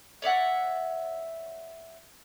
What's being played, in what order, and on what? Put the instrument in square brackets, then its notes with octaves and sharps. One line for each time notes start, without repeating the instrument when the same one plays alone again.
[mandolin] C#5 D5 E5 F#5